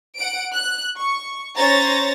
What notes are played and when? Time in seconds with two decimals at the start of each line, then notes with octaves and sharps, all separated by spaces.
0.16 F#5 D7
0.53 F#6
0.98 C#6
1.57 C#4 C5 C#5 A#5 A6 A#6